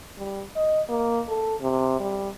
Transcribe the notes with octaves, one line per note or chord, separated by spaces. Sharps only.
G3
D#5
A#3
A4
C3
G3